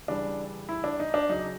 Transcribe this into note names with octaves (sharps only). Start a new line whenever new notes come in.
C#3 E3 G3 D4
E4
D4
D#4
D4
C#3 F#3 D#4